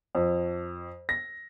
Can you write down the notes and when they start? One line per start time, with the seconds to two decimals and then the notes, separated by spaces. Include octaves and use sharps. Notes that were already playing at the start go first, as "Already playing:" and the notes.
0.15 F2
1.09 A#6